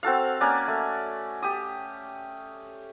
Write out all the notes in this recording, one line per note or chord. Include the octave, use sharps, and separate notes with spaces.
C4 F#4 A4 F5
A#3 C#4 D5 F#5
A3
G4 D#6